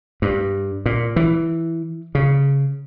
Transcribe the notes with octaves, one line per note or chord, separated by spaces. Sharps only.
G2
A#2
E3
C#3